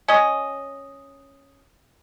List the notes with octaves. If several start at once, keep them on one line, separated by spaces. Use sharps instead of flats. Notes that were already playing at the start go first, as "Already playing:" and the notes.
C#4 D#5